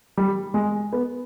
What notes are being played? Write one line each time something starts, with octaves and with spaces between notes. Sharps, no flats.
G3
G#3
B3